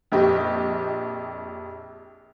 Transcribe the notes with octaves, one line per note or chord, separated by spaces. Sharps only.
A#1 F2 G4 C5 D#5